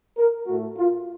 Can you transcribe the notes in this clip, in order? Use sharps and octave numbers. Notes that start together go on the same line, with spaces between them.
A#4
A2 A3 F#4
F4